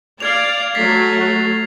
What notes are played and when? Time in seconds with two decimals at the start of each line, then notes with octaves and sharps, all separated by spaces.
0.20 D5 F5 F6 G#6 F7
0.75 F#3 A3 A6 B6 C7